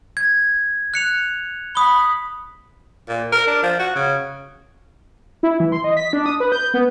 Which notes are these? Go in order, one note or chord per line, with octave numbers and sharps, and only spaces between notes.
G#6
F#6 C#7 F7
B5 D#6 G7
A#2
A#4
D4
F3
F#4
C#3
E4
E3
C6
D#5
B6
D4
D#6
B4
G6
B3